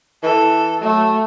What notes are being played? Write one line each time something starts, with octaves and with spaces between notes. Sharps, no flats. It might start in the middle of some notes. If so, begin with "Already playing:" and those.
E3 A4
F#3 A3